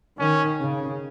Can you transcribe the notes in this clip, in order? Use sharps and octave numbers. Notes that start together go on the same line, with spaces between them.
D#3 C#4
C#3